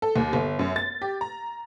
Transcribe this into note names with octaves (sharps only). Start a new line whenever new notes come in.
A4
D#2
G1
F#2
A6
G4
A#5